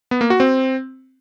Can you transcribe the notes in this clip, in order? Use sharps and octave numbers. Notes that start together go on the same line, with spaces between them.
B3
A#3
F#4
C4